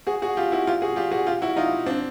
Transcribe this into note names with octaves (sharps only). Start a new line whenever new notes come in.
F#4 G#4
F#4 G#4
F4 G4
E4 F#4
F4 G4
F#4 G#4
F4 G4
F#4 G#4
F4 G4
E4 F#4
D#4 F4
C4 D4